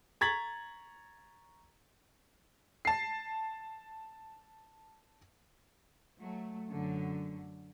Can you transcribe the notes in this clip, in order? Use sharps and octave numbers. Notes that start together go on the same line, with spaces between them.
A#5 C#6 G#6 A6 B6 F#7
A5 C7
F#3 A3
F#2 D3 F#3